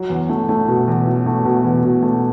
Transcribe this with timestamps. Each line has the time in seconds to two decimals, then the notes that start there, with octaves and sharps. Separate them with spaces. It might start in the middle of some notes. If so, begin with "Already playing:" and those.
Already playing: F#3
0.10 E2
0.30 A3
0.49 A3
0.68 B2
0.88 E2
1.06 F#3
1.26 A3
1.45 B2
1.64 E2
1.84 B2
2.03 A3